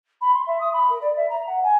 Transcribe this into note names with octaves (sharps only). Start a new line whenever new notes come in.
B5
C6
E5
D#6
B5
A#4
D5
E5
A#5
F#5
G#5